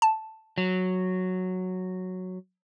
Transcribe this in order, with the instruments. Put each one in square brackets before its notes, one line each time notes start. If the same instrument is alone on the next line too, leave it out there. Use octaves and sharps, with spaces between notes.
[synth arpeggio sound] A5
[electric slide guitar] F#3